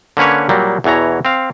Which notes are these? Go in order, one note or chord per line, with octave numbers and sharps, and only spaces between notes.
D3 A#3 C#4 B4 C#5
A#2 F#3 G3 A#3
E2 B2 E3 C#5 A#5
C4 F5